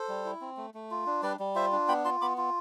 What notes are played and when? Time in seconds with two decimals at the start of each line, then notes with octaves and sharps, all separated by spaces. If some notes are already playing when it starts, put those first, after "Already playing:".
Already playing: A4 C5
0.09 G3
0.25 E4
0.41 C4
0.57 A3
0.74 A3
0.91 F4
1.06 D4
1.23 G3 B4 D5
1.39 G3
1.55 F4 C5 E5
1.72 D4
1.88 B3 G5 B5
2.05 F4 A5 C6
2.21 B3 B5 D6
2.38 F4